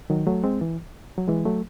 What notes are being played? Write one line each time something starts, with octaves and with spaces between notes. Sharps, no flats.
D#3 F#3
F#3 A3
G#3 C4
E3
F#3
E3 G#3
F#3 A3